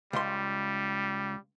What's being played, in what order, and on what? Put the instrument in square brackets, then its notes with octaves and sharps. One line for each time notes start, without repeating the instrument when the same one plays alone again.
[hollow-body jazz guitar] C#2 C6 [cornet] G3